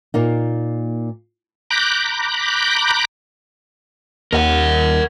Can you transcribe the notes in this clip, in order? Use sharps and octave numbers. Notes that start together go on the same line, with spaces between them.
A#2 A#3 D#4
A#5 B5 D6 F#6 G6
D#2 A#4 F#5